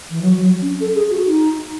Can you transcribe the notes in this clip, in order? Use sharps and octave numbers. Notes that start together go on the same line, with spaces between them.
E3
F#3
F#3
C#4
A4
G#4
F#4
D#4